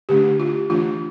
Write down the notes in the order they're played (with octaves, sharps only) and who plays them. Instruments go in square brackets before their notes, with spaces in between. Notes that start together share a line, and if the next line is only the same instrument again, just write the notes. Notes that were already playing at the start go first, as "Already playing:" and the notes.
[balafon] D3 A3 D4 G4
F4
E3 A3 D4 F4